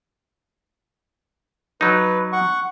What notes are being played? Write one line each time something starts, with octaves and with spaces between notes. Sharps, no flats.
F#3 D#4 B4
F#5 C#6